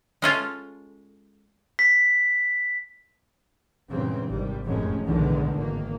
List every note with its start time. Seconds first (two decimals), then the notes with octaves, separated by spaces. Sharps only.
0.22 G#3 C#4 F4 A4
1.79 B6
3.90 E2 G2 A#2 C#3 G#3 C4
4.27 G#1 C3 G3
4.65 F1 F#2 A2 C3 G#3 C#4
5.05 B1 E2 A2 D3 D#3 G#3
5.54 G#1 D#3 A#3